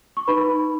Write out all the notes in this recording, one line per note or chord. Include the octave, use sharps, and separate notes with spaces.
C#6
D#4 B4 B5